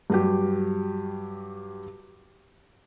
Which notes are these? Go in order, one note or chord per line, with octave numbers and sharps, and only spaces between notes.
G2 F#3 G4